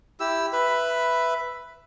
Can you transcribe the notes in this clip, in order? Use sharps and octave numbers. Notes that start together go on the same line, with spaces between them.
E4 G4 E6
B4 E5 B5